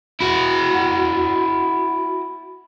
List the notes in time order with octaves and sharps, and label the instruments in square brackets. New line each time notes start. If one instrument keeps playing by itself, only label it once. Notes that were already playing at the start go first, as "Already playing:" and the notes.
[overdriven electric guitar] E4 F#4